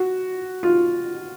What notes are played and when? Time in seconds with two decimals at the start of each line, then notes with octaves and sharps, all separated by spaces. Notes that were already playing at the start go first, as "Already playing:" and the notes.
Already playing: F#4
0.63 F4